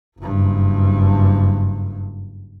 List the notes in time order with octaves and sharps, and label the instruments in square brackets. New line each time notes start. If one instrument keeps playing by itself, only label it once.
[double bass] F#1 G2